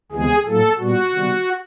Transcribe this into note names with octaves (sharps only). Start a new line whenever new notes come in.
D2 C3 E3 G#3 B3 G#4
A2 F#3 A#3 A4
A#2 G3 B3 F#4
C3 D#3 G3 B3